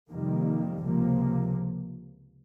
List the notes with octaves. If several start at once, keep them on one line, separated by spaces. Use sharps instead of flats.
F2 C3 D#3 G3 A#3
C#2 C3 F3 A#3